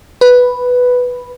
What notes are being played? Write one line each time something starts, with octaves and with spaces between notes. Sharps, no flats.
B4